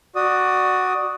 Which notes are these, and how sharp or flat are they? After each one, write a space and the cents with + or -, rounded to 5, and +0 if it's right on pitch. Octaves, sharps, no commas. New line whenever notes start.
F#4 +0 D5 +15 D#6 +5